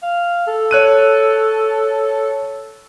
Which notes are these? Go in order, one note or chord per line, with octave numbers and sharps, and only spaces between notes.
F5
A4
C#5 F#6 D#7